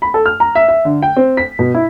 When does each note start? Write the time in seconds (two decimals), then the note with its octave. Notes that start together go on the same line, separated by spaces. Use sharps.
0.02 B5
0.14 A4
0.26 F6
0.40 A#5
0.55 E5
0.68 E5
0.85 D3
1.02 G5
1.16 C4
1.37 B6
1.59 B2
1.75 E4